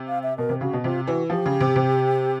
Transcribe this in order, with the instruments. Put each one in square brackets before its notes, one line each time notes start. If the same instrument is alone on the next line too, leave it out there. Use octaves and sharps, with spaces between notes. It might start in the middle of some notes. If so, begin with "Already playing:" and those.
Already playing: [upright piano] C3
[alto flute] F5
E5
[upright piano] B2 [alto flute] A#4
[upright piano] C3
[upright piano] C#3 [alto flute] F#4
[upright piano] B2
[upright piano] C3 [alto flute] F4
[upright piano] E3 [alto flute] F#4
[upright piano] F3 [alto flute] G4
[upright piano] C#3
C3
C3